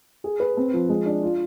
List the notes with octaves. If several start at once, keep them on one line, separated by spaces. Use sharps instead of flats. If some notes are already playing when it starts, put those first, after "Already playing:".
G#4
B4
C4
F3
G#3
D4
F4